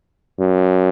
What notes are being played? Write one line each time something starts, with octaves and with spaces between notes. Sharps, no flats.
F#2